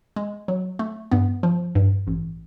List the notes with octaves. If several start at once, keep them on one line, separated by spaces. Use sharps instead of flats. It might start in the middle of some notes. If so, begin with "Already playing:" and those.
G#3
F#3
A3
G2 B3
F3
G2
A1